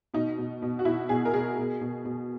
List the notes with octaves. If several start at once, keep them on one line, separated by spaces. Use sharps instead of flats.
B2 D#4
B2
B2
F#4
B2 E4
B2 G#4
A#4
B2 G#4
B2
B2
B2